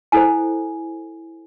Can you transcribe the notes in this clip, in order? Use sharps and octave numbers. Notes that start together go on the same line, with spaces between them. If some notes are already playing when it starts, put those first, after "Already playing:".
E4 A4 C5 G#5